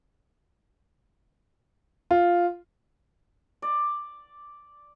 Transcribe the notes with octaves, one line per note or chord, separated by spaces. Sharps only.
F4
D5